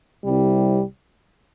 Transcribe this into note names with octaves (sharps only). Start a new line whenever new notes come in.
C2 C3 G3